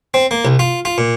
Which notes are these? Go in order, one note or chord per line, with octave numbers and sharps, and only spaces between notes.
C4
A#3
C2
F4
F4
A#2